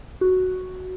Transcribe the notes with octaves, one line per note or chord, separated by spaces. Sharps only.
F#4